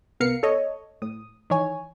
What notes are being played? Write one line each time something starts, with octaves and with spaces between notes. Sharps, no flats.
C2 B3 A#4 F5 C7 C#7
A4 C#5 D#5
A2 D#6
D#3 E3 C#5 G#5